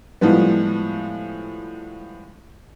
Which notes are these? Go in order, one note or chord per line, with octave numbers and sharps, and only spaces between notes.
A2 F3 G3 G#3 B3